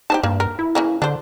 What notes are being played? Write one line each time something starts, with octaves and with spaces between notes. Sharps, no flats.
D#4 G4 C5 A5
G2 A#3
A#4
E4
C#3 E3 A#3
D3 D4 C5